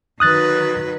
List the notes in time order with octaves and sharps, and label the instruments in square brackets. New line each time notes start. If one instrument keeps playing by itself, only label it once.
[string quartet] D#3 F#3 B4 [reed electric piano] D#6 F#6 A6